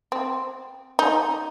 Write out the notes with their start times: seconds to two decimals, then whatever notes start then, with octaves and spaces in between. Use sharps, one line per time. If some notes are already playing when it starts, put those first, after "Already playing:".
0.12 C4
0.99 D#4